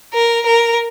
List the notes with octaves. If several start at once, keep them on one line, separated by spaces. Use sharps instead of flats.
A#4
A#4